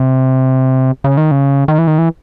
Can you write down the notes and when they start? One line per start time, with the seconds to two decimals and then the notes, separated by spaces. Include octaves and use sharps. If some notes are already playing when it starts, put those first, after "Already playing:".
Already playing: C3
1.04 C#3
1.17 D#3
1.31 C#3
1.68 D#3
1.78 E3
1.87 D#3
1.98 E3